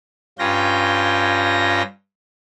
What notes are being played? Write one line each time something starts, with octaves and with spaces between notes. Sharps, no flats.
G2 C#4 F4 G5 A#6